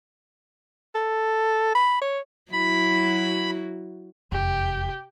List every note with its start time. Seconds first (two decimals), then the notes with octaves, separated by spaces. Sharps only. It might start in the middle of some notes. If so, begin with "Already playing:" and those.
0.95 A4
1.75 B5
2.01 C#5
2.52 F#3 E4 F#4 B5
4.32 F1 E2 G4